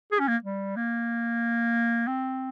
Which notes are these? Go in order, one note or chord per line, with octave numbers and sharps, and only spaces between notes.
G#4
C#4
A#3
G3
A#3
C4